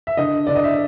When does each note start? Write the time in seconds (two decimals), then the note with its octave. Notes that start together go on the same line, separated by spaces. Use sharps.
0.07 E5
0.17 D3 D#5
0.47 D3 D5
0.55 D#5
0.64 E5